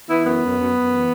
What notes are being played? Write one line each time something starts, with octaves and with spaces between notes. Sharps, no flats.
E3 B3 E4
F#2 B3
F#2
F#2
F#2
E3